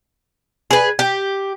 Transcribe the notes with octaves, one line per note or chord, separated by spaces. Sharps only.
G#4 B4
G4